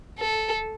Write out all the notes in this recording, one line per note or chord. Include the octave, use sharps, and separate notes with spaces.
A4